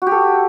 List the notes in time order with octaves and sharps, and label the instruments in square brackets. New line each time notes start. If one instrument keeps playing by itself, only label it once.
[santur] F#4
G4
A4